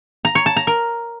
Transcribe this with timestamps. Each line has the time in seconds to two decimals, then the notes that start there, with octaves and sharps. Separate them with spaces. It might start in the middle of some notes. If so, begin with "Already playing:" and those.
0.25 A#5
0.35 C#5
0.46 A5
0.57 A#5
0.67 A#4